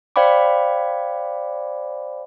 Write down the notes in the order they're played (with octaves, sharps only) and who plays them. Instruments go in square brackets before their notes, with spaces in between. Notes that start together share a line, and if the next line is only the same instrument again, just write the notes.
[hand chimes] C5 D5 F5 G5 B5 D6